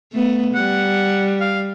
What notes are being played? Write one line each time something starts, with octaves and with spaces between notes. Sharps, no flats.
A3 B3
G3 F#5
F5